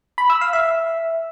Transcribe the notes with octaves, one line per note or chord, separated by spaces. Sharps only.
B5
E6
F5
E5